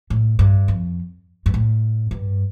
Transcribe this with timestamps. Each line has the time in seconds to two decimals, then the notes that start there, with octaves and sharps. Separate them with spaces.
0.10 A2
0.39 G2
0.68 F2
1.46 G2
1.54 A2
2.11 G2